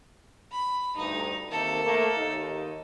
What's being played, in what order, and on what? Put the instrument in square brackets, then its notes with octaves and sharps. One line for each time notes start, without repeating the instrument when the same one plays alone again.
[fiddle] B5
[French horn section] D2 G2 [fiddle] D#4
[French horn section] C3 D#3 A#3 [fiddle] A4
[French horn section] A3 A#3
D#2 D#4